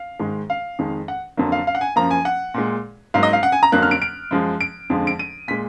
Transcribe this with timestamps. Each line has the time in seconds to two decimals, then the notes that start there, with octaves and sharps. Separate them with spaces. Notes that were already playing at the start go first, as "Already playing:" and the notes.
Already playing: F5
0.20 G#2 D#3 G#3
0.50 F5
0.79 F2 D#3 G#3
1.08 F#5
1.37 F2 D3 F#3 A#3
1.52 F5
1.67 F5
1.75 F#5
1.81 G#5
1.96 F#2 F3 A#3 A#5
2.11 G#5
2.25 F#5
2.54 A#2 G#3
3.14 G#2 F#3 A#3 F5
3.23 D#5
3.33 F5
3.43 F#5
3.52 G#5
3.63 A#5
3.72 F2 D3 F#3 A#3 F#6
3.83 F6
3.91 D7
4.02 D7
4.31 F#2 F3 G#3
4.61 D7
4.90 F2 D3 F3 G#3
5.07 D7
5.19 D#7
5.48 A#2 G#3 B6